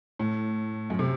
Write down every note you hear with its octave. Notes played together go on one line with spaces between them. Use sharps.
A2
F#2
C3